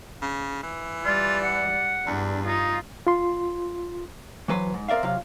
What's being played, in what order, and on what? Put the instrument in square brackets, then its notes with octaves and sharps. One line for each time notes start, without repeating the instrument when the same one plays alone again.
[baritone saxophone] C#3
E3
[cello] G3 D5 [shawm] F4
[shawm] F#5
[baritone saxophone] E2 [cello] G2 D4
[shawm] D#4 [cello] F4
[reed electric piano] F4 C6
[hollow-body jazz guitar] E3 F#3 B4 C5
G#2
C4 A#4 D5 E5 F5
C3 F#3 F4 F5